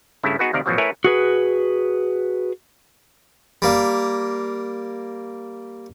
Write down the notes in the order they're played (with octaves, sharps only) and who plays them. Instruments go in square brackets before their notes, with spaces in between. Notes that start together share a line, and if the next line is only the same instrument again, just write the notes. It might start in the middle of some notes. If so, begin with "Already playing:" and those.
[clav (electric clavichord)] G2 C#3 A3 E4
B3 D#4 F#4 G#4 B4
D2 C3 D#3 A#4 D5 F5
A1 B2 F3 F#3 F#4
A3 E4 A#4 B4 C#5 G#5
[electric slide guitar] F#4 G#4 B4
[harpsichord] G3 A#3